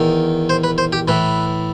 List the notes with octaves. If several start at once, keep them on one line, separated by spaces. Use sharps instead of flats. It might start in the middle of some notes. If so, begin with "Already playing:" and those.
Already playing: E2 D#3
C5
B4
C5
G4
A2 E3 B4